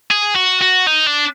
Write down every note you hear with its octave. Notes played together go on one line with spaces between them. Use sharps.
G#4
F#4
F#4
D#4
D4